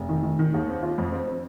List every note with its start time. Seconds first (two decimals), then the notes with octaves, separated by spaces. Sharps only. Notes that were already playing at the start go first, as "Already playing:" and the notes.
Already playing: F1
0.09 D#3
0.23 D#3
0.39 D#3
0.54 D#2
0.69 C4
0.83 F4
0.98 F2
1.12 C4
1.28 C4